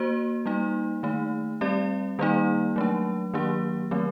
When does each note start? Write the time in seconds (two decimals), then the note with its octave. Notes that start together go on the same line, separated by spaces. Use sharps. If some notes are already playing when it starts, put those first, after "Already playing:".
Already playing: A#3 F#4 C5
0.46 G3 A#3 D#4
1.03 D#3 A3 D#4
1.61 G3 C4 G4 D5
2.19 D#3 G3 A#3 D#4
2.76 F#3 A3 D4
3.34 D#3 F#3 A#3 D4 G4
3.91 D#3 F#3 A3 C4